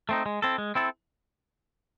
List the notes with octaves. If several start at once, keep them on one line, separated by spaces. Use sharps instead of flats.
A3 C4 D#4
G#3
C4 E4 A4
G#3
C4 E4 A4